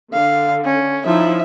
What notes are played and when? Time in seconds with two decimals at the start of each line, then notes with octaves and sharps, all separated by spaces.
0.13 D3 F5
0.65 C#4
1.06 F3 D#4 E4 E5